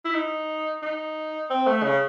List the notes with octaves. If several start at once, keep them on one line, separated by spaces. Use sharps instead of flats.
E4
D#4
D#4
C4
A3
C#3